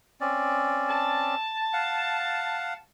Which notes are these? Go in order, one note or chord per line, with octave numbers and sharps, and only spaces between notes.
C4 C#4 D5
A5
F5 F#5